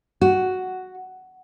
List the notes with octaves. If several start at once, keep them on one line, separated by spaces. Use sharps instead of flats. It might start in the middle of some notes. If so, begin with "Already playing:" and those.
F#4